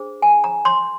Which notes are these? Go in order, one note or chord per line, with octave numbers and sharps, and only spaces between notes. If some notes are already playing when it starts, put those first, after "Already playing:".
Already playing: D4 G#4 C5
G#5
A#5
C6